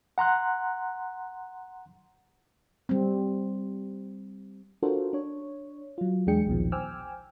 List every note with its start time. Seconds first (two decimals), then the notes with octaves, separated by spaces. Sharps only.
0.18 F#5 A#5 C6 F#6
2.89 G3 C4
4.83 D4 F4 F#4 A4 A#4 C5
5.13 D4 C#5
5.98 F#3 F4
6.27 E2 G#3 D4 G#4 G5 C#7
6.47 A#1 D#2 B2 D#3 F3
6.72 C5 G5 G#5 D6 E6 F6